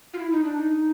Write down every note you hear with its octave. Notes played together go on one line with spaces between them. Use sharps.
F4
E4
D#4
D4
D#4